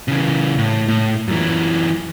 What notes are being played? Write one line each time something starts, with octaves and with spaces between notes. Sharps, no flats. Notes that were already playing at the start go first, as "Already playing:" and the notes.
C#3 E3
A2
A2
F#2 E3